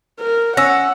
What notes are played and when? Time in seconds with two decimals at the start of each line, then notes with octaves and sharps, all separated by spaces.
0.20 A#4
0.57 C#4 F#5 E6 A#6